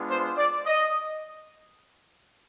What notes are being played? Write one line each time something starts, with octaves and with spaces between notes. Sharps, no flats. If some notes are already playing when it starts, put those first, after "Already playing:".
Already playing: G#3 B3 D4 F4
C5
D5
D#5